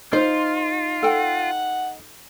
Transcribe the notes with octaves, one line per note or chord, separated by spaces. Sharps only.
D#4 F4 C5
A4 F#5 G5